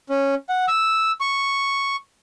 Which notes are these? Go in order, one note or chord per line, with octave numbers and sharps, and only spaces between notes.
C#4
F#5
E6
C#6